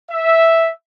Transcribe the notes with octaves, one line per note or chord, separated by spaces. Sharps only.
E5